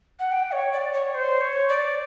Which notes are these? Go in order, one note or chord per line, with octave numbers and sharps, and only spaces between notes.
F#5
G5
C#5
D5
C#5
C5
C#5
D5